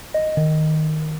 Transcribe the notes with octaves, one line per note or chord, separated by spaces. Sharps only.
D#5
D#3